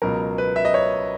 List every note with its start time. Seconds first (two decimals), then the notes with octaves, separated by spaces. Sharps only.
0.02 C#2 B2 F#3 A#4
0.38 B4
0.56 E5
0.65 D#5
0.74 C#5